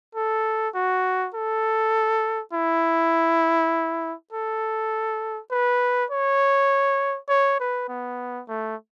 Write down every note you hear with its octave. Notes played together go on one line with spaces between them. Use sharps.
A4
F#4
A4
E4
A4
B4
C#5
C#5
B4
B3
A3